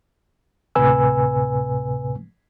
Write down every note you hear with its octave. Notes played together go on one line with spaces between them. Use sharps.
D2 A2 C3 B4 G#5 E6